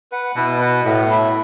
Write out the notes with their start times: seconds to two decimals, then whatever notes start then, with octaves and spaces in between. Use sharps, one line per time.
0.12 B4 F#5
0.37 B2 E4
0.60 B4 F#5
0.85 A2 B3
1.10 E4 A4 E5